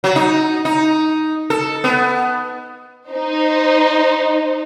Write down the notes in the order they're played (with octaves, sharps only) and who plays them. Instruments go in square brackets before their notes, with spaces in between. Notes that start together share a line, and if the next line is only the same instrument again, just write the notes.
[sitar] F#3
D#4
D#4
A4
B3
[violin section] D#4 C5